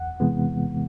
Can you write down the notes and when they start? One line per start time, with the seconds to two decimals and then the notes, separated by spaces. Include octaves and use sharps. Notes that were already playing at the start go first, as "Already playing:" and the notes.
Already playing: E2 F#5
0.20 C3 E3 G#3 B3